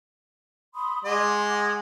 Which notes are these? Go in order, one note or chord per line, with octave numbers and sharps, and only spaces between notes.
B5 C6 D#6
G#3 D#5 F#5 C6 D6